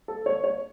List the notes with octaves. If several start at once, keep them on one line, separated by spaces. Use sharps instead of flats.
A4
C#5
C#5